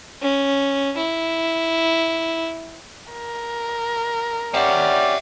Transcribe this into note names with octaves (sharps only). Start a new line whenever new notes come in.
C#4
E4
A#4
C#4 G4 D5 E5 F#5